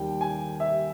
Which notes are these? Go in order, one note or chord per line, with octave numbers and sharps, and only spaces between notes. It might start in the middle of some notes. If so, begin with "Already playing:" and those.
Already playing: D#2 D#3 G3 G5
G#5
E5